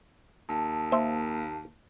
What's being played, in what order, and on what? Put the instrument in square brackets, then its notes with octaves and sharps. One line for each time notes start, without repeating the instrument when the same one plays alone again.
[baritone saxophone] D#2 [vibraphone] A5
[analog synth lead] A#3 [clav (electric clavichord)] C5 E5